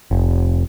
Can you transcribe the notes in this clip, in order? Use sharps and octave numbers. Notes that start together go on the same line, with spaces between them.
F1